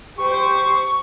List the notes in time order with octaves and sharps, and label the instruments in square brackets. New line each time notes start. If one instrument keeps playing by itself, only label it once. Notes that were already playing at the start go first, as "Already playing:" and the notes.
[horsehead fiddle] G4 C5 [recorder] C#6